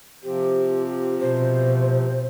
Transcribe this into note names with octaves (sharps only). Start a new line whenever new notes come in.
C3 F3 C4 G4
B2 C5